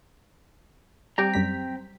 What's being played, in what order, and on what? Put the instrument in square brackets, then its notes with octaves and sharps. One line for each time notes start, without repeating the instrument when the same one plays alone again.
[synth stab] G3 G4 [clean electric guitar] C4 G5 A#5
[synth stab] F#2 G3 B6